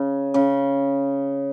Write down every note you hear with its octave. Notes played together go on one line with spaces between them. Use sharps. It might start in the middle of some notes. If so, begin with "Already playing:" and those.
Already playing: C#3
C#3